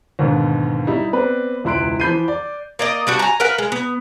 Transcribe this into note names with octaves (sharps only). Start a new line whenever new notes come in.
D#2 G#2 B2 D3
G3 D#4 E4
B3 C4 B4 D5
E1 C#2 E4 C6 F#6 D7
E3 F3 B5 G6 C7 D#7
D5
A#3 D5 D#5
G3 D4 F#4
G#5 A#5
A#4 B4 F#5
G#3
B3